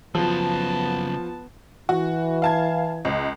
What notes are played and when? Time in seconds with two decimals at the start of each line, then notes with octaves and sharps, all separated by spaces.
0.15 C#3 F3 F#3 B3 A5
1.89 E3 F#4
2.42 F5 A5 G#6
3.05 C#2